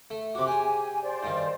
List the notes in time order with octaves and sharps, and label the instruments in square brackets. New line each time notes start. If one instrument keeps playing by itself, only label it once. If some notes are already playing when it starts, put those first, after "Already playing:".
[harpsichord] A3
[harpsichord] C3 F#4 [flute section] D6
[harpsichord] G4 G#4 [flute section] G#5
[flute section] C5 D5
[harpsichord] G2 D#3